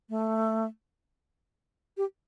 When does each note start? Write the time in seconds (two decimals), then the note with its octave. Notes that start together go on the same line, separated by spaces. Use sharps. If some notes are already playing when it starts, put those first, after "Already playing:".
0.09 A3
1.97 G4